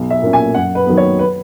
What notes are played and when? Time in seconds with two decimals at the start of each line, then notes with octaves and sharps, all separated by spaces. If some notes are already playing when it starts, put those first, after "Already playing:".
Already playing: B1
0.10 E5
0.22 A#2 A#3 C#4
0.33 G#5
0.54 F#2 F#5
0.75 B4
0.86 D#3 F#3 B3
0.97 C#5
1.19 B4